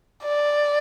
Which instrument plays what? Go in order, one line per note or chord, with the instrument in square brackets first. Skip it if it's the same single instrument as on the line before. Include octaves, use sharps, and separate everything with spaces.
[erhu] D5